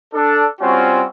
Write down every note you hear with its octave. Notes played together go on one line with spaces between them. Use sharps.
D4 A4
G3 C4 C#4 F4 F#4